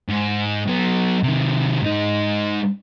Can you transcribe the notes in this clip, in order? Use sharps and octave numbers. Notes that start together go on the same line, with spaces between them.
G#2
F#3 B3
C3 D#3
G#2 D#4